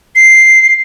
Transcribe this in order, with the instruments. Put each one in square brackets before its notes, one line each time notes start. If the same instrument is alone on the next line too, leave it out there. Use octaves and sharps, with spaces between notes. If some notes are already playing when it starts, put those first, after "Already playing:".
[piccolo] C7